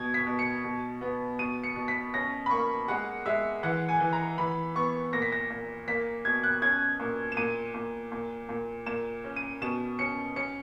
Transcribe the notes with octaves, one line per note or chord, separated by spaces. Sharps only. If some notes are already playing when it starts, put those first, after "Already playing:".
Already playing: B2 G#6
B6
B2
C#7
B2
B3
B2 D#7
C#7
B2
B6
C#4 A#6
B5
A#3 C#6
G#3 F#5
G#3 E5
E3 F#5
G#5
E3
A#5
E3 B5
B3 C#6
A#2 A#6
B6
A#6
A#2
A#3 B6
B2 G#6
F#6
C#4 G#6
A#2
E7
A#2 D#7
A#2
A#2
A#2
A#2 E7
C#4
D#7
B2 E7
C#4 C#7
C#4 C#7